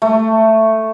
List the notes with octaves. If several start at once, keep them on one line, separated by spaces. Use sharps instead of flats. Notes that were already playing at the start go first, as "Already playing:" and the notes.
A3